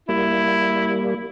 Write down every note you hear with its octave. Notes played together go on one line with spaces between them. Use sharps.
G3 A#3 E4